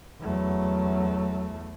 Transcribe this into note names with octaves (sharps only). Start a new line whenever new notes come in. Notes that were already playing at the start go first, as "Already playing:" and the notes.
E2 F#3 A3